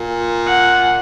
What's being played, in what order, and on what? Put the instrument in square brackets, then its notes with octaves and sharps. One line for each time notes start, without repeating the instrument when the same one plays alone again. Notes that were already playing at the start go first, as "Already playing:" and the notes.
Already playing: [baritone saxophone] A#2
[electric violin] F#5